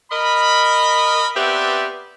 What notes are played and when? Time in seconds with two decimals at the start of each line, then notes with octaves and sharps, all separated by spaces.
0.12 A#4 D#5 B5
1.36 B3 C4 G4 B4 D5 E5